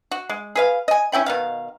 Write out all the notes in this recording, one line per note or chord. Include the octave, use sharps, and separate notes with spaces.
F#4
G#3
G#4 B4 F5
D#5 G#5
C#4 E4 G5 B5
B2 D#3 F5